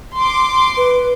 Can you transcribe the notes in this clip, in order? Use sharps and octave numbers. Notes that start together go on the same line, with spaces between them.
C6 D6
B4